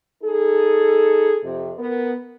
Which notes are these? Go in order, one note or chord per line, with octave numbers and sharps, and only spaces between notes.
D#4 G#4 A4
F2 C3
B3 A#4